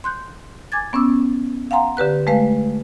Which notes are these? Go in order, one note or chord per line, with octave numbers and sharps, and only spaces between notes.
C6 F#6 G6
G#5 D6 G#6 A6
B3 C#4 D6 E6
F5 F#5 G#5 A#5 C6
D3 G4 B4 F#6
G#3 A3 B4 F5